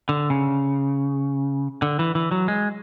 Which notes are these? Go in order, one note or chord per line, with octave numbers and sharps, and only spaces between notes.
D3
C#3
D3
E3
E3
F#3
G#3